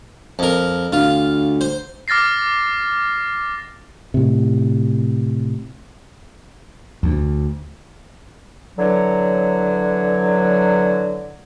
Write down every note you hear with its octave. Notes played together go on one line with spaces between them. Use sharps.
F2 A#4
D2 F4
C5
D6 F6 A6 A#6 C7
A2 C3
D2
D3 E3 F#3